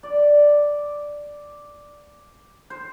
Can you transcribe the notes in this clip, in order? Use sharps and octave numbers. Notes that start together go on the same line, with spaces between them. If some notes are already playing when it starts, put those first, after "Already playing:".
D5
C5